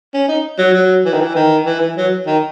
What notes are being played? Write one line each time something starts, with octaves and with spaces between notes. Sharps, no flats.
C#4
D#4
F#3
F#3
E3
D#3
E3
D#3
E3
E3
F#3
D#3